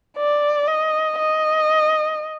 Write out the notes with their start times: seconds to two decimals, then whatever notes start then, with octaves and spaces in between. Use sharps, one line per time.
0.17 D5
0.67 D#5
1.18 D#5